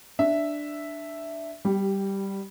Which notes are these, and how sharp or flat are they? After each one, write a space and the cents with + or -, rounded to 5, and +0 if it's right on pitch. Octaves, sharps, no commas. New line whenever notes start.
D4 +5 E5 +0
G3 +0 G4 -25